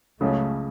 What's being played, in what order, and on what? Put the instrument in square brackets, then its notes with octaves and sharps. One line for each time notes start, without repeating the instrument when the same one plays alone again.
[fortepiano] C#2 C#3 F#3 C#4 [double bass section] A3